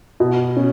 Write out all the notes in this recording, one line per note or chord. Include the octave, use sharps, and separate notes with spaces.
B2
C#4